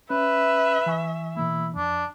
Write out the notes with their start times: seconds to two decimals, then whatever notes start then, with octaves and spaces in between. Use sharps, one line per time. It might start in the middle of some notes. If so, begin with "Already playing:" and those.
0.10 C#4 B4 E5
0.86 E3 G#5 C#6
1.37 B2 E3 A#3 E4
1.76 F2 D4